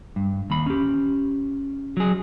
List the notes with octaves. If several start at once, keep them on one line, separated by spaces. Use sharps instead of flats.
G2
D#2 B5
C#4 G4
F#3 G#4